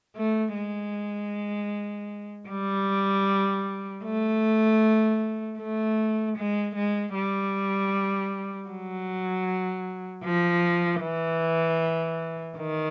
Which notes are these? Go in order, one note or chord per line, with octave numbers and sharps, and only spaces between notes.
A3
G#3
G3
A3
A3
G#3
G#3
G3
F#3
F3
E3
D#3